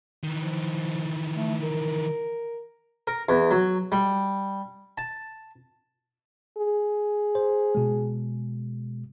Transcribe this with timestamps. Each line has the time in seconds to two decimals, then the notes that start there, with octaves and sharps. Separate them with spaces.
0.24 D#3 E3
0.40 F3
1.37 A3
1.63 A#4
3.07 A#4
3.29 E2
3.51 F#3
3.92 G3
4.98 A5
6.57 G#4
7.35 C5
7.75 B2 G#3